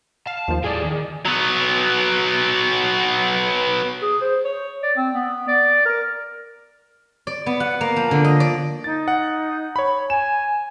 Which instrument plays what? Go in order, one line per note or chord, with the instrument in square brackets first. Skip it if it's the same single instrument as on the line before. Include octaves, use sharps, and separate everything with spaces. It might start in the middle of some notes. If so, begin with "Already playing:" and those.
[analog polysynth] F5 [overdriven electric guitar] A5
[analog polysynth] D#2 F3
[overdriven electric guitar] A2 G3 [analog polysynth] G#4 D5
[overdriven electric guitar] D#3
[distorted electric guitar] F#3 B3
[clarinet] G#4
C5
C#5
D5
C4
B3
D5
A#4
[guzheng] D5
B3
F#5
A#3
F3
D3
D#5
D5
[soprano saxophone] D#4 [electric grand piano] A6
[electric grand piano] F#5
C#5 B5
[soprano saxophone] G#5 [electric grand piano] E7